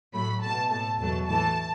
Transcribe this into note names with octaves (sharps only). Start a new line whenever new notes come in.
A2 F#3 A3 B5
B2 A3 A5
A2 A3 A5
E2 B2 F#3 A3 A5
A2 E3 A3 A5